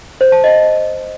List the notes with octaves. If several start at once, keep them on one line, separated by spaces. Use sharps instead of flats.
C5
A5
D#5